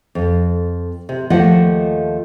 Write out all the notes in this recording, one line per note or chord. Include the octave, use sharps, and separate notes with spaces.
F2
C3
D#2 F3 A3 D#5 F#5